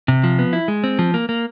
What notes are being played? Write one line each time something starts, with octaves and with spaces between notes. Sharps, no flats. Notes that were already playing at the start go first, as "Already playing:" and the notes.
C3
F3
B3
E4
G#3
C4
F3
A#3
A#3